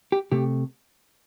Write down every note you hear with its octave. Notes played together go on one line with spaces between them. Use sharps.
G4
C3 A3 G4